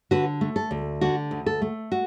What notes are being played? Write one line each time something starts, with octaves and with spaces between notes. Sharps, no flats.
D3 F#4 B4
A3
A4
D2
D3 F#4
D2
A4
A3
F#4